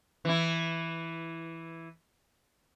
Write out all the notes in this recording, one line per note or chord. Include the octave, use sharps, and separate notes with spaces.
E3 E4